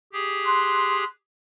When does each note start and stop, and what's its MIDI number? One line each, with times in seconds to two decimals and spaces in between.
0.13 1.04 67
0.13 1.04 68
0.45 1.05 84
0.45 1.05 90